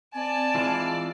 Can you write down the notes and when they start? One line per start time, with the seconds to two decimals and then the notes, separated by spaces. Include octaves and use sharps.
0.15 C4 D5 G#5 A5
0.55 E3 G#3 F4